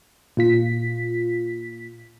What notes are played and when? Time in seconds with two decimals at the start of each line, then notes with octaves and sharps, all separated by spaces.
0.37 A#2 F4 B6